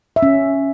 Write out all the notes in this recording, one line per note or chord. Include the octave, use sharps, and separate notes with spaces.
E5
C#4